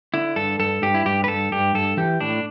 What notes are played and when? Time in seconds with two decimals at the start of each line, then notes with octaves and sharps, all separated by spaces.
0.14 D3 E4
0.36 G2 A4
0.60 G2 A4
0.82 G2 G4
0.94 E4
1.06 G2 G4
1.24 B4
1.28 G2 A4
1.52 G2 G4
1.75 G2 A4
1.97 E3 G4
2.21 A2 D4